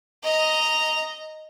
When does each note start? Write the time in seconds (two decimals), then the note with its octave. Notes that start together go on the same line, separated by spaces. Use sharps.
0.23 D#5 A#5